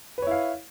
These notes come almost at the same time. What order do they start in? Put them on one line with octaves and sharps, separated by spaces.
B4 C#5 E4 F5